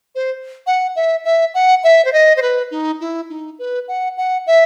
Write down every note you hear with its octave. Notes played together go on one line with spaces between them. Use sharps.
C5
F#5
E5
E5
F#5
E5
C5
D#5
C5
B4
D#4
E4
D#4
B4
F#5
F#5
E5